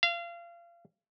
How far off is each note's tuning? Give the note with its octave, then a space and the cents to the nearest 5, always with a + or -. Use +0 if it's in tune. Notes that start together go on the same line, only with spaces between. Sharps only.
F5 -30